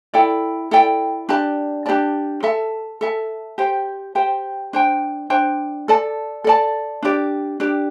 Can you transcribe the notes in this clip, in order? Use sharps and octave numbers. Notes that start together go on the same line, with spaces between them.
E4 A4 D5 G5
E4 A4 D5 G5
D4 G4 D5 A5
D4 G4 D5 A5
A4 E5 A5
A4 E5 A5
G4 C5 G5
G4 C5 G5
D4 C5 G5
D4 C5 G5
A4 D5 A5
A4 D5 A5
D4 G4 D5
D4 G4 D5